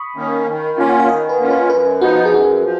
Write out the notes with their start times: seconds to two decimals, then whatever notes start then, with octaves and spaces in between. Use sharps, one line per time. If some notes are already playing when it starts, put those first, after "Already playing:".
Already playing: B5 C#6 D#6
0.16 D#3 A#3 C#4
0.48 D#3
0.78 A#3 C#4 F4 G#5
0.89 F#5
1.00 F5
1.09 D#3 D#5
1.29 B4
1.39 A#3 C#4 F4
1.50 B4
1.70 F#2 B4
2.01 F3 B3 D#4 F#4
2.16 F#4
2.25 G#4
2.32 F#2 F#4
2.63 F3